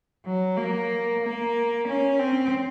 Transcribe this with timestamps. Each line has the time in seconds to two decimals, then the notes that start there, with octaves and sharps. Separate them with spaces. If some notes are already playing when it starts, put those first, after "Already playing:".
0.26 F#3
0.57 A#3
1.23 A#3
1.88 C#4
2.19 C4